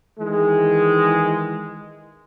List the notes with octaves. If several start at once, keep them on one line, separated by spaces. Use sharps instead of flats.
D#3 E3 G#3